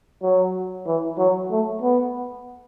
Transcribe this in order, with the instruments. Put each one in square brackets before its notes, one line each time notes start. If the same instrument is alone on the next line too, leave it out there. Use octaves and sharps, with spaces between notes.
[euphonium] F#3
E3
F#3
A3
B3